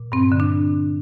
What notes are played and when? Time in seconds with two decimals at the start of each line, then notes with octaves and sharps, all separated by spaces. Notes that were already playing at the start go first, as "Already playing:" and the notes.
Already playing: A#2
0.12 G2 C4
0.32 D3
0.40 D4